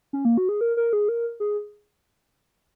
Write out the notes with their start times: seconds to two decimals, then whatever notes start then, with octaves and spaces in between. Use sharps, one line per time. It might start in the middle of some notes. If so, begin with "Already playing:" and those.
0.13 C#4
0.25 A#3
0.38 F#4
0.49 G#4
0.61 A#4
0.77 A#4
0.93 G#4
1.09 A#4
1.40 G#4